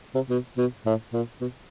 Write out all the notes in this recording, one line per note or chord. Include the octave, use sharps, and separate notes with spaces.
C3
B2
B2
A2
A#2
B2